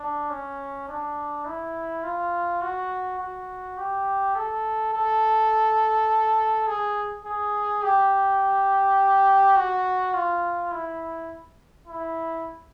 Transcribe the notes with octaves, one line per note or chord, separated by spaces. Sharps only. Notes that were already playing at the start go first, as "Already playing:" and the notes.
Already playing: D4
C#4
D4
E4
F4
F#4
F#4
G4
A4
A4
G#4
G#4
G4
F#4
F4
E4
E4